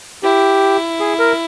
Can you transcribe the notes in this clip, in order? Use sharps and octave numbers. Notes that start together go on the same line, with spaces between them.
E4 G4
G#4
A#4